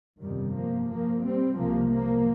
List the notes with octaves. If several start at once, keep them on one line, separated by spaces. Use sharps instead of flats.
G1 F2 C3 D#3 G3
F3 A#3
F3 A#3
G3 C4
C2 C3 F3 A#3
F3 A#3